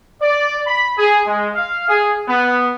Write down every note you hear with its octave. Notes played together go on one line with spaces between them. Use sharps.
D5
B5
G#4
G#3
F5
G#4
B3